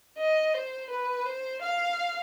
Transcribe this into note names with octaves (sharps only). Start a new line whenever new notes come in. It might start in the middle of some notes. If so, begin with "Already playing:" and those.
D#5
C5
B4
C5
F5